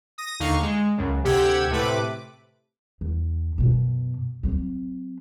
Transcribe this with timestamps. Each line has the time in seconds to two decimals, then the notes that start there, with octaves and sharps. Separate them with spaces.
0.18 D#6 A#6
0.40 D#2 D3 D#4 F5 C#6
0.63 G#3
0.98 C#2 F#2 C#3
1.24 D2 C3 G4 F#5 E6 G#6
1.70 A2 C3 A3 B4 D6
3.01 E2
3.58 F#2 B2
4.43 F#3 C4